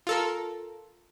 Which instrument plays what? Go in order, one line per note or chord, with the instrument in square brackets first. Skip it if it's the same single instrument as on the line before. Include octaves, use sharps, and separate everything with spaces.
[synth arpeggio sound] F4 A4 A#4